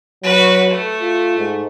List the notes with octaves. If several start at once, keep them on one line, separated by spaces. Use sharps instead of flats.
F#3 F#4 B4
A3
F4
G#2